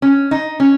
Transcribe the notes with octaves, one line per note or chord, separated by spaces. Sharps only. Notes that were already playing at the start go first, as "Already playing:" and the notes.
C#4
D#4
C#4